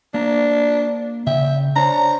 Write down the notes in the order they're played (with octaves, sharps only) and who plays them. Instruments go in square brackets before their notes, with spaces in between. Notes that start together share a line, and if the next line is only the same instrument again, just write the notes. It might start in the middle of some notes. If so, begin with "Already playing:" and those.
[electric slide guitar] A#3 A#5 [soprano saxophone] D4
[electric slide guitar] C#3 G5 [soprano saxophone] E5
[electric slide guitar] D4 C5 C#5 [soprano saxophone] A#5